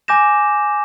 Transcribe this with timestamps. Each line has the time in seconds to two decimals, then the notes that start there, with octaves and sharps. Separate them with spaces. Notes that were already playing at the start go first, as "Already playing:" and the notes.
0.08 G#5 D6 G6 A#6 E7